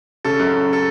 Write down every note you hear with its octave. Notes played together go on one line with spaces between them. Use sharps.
C#3 A4
F#2
F#2
A4